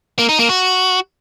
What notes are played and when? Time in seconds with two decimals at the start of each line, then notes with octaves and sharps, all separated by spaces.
0.19 A#3
0.29 D#4
0.39 A#3
0.49 F#4